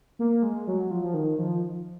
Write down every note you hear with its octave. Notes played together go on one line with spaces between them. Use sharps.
A#3
G#3
F#3
F3
F3
D#3
F3